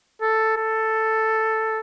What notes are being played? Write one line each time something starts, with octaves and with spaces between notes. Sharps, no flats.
A4
A4